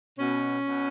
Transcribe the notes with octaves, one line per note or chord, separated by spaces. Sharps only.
B2 C#4
B2